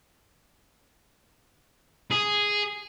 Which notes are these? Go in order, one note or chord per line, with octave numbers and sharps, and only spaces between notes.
G#4